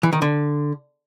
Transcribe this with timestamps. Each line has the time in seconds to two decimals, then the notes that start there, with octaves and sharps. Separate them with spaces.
0.03 E3
0.13 D#3
0.22 D3